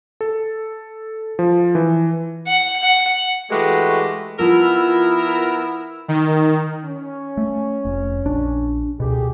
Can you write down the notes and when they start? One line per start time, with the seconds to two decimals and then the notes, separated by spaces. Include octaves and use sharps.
0.21 A4
1.39 F3
1.75 E3
2.47 F#5
2.83 F#5
3.51 E3 G#3 A3 F#4 G4 B4
4.39 F3 B3 E4 A#4 E6
6.08 D#3
6.85 C#4
7.37 A3
7.85 F1
8.25 A#1 D4
9.00 C#2 B2 A3 G4 G#4